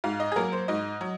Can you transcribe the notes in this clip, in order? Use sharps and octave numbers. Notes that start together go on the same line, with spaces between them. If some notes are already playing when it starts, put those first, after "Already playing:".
G#2 F5
D#5
G#4
F#3 A#3 A#4
C5
G#2 D#5
F#3